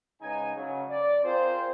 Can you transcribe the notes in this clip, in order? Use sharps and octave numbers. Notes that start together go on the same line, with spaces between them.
G#2 C#3 D#4 B4 G#5
C#3 F#3
D5
C4 F4 G#4 A#4 C5